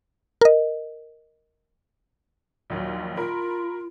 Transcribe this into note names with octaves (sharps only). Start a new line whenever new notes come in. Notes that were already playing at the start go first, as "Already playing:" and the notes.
A#4 D#5
A#1 D#2 F#3
F4 A#4 B5